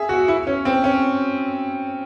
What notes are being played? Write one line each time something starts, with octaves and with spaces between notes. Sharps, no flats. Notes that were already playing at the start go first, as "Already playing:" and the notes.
Already playing: G#4 E5
F#4
E4
C#4
C4
C#4